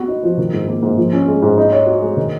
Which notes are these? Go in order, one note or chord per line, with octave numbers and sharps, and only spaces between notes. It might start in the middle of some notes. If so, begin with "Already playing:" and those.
Already playing: B3 F#4
D#4
F3
D#3
G#2
A#3
G#2
F3
C#4
G#3
G#2
D#4
C#5
F#4
G#3
D#3